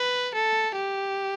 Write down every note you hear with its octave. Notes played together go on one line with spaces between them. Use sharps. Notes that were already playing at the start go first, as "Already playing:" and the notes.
Already playing: B4
A4
G4